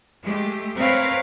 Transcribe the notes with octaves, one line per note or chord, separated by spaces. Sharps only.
G#3 A3 G4
C4 A#4 B4 C#5 F5